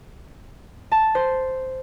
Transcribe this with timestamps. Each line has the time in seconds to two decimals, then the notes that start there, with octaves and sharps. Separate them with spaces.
0.92 A5
1.15 C5